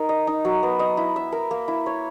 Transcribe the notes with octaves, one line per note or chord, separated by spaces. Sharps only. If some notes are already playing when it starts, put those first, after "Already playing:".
Already playing: D#4 A#4
D#5
D#4
F#3
B3
D#5
E4
E5
A#4
A#3
E4
C#5